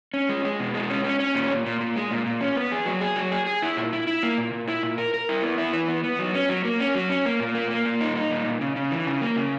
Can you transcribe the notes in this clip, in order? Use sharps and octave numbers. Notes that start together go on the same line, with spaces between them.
C#4
G#3
G#3
B2
G#3
C#4
C#4
C#4
A#2
A#2
A#2
A#2
G#3
A#2
A#2
C#4
B3
G#4
F#3
G#4
F#3
G#4
G#4
E4
A#2
E4
E4
A#3
A#2
A#2
E4
A#2
A#4
A#4
E4
B3
E4
E3
B3
B3
F#3
C#4
F#3
A#3
C#4
F#3
C#4
A#3
A#2
A#3
A#3
A#2
D#4
D#4
A#2
A#2
C#3
C#3
E3
C#3
A#3
C#3